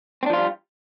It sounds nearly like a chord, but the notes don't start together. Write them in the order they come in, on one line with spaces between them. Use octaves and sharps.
C4 D4 F3 F4 G3